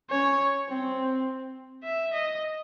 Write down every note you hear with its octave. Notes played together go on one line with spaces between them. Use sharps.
C#4 C#5
C4
E5
D#5